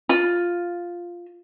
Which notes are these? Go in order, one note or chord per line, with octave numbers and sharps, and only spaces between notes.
F4